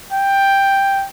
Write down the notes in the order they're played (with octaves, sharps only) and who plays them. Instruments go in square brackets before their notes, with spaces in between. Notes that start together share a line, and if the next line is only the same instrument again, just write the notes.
[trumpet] G5